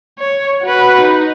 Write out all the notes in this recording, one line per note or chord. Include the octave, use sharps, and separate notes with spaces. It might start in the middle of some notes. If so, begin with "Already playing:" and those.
C#5
F#4 B4
D#4